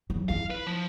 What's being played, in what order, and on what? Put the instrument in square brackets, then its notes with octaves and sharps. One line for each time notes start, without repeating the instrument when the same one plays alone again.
[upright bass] E3 F#3
[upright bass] E4 F4 [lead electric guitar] F5
[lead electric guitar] B4
F3